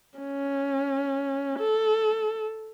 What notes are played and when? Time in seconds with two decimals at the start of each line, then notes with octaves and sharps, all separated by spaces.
0.18 C#4
1.59 A4